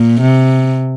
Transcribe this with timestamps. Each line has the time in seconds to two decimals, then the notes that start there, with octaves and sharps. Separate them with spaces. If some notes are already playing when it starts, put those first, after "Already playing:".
Already playing: A#2
0.21 C3